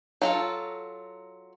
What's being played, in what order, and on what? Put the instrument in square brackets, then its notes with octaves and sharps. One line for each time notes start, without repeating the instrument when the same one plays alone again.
[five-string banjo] F#3 F4 A4